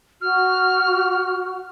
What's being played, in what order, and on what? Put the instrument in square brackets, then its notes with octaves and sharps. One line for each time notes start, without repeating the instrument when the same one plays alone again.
[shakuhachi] F#4 [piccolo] F6